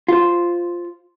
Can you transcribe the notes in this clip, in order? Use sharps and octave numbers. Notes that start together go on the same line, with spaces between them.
F4 C5